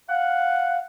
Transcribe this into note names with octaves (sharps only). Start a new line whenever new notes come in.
F5 F#5